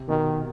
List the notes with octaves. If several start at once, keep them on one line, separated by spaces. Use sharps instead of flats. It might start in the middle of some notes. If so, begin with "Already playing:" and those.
Already playing: C3
B2 D#3